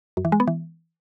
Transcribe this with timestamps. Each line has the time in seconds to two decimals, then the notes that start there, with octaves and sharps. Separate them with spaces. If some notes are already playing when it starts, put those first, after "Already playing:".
0.17 F#2
0.25 E3
0.32 G#3
0.40 B3
0.47 E3